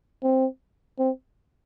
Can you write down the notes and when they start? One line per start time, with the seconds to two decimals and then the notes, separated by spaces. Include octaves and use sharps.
0.23 C4
0.99 C4